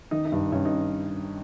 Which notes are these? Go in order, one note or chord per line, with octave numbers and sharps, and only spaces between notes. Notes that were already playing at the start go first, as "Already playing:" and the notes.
D#3 D#4
D#4
G2
G2 C#4
D#4